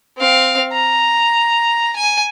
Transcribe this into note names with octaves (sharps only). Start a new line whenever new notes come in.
C4 F5
A#5
G#5